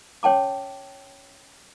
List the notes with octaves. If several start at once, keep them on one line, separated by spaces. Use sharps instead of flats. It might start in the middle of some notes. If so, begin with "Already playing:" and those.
C#4 C#5 G5 A5 D6